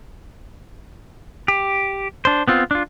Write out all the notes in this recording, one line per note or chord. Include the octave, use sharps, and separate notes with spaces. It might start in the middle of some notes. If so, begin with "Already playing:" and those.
G4
D4 C5
B3 C4 F4
D4 F4